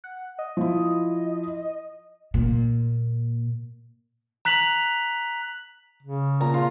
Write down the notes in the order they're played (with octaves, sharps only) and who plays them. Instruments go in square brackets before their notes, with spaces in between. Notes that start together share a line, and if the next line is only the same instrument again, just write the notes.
[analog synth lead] F#5
D#5
[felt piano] F3 E4
[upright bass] A#2
[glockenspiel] A#5 F#6 B6 F7 F#7
[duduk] C#3
[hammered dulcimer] A#2 A#5
F4